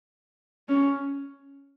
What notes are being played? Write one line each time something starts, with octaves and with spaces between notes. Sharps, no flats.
C#4